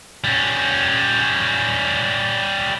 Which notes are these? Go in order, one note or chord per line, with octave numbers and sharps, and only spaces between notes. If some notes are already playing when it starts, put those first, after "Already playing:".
G3 C#4